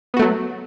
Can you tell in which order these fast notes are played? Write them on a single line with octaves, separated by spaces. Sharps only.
B3 F#4 A3 F#3